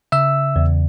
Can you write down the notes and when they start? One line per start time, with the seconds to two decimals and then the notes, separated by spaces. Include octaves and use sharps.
0.12 C#3 E5 E6
0.56 E2